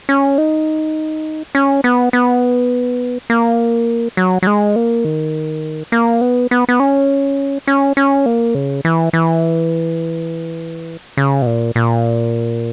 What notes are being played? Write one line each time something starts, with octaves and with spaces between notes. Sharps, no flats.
C#4
D#4
C#4
B3
B3
A#3
F#3
F#3
G#3
A#3
D#3
A#3
B3
B3
B3
C#4
C#4
C#4
A#3
C#3
E3
E3
C#3
B2
A#2
A#2